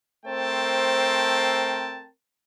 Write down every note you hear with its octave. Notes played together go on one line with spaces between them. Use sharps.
A3 C4 A#4 C5 G5 A5